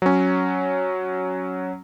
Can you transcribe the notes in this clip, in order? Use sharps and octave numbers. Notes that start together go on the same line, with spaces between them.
F#3 C#4